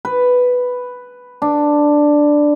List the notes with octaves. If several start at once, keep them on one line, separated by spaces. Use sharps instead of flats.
B4
D4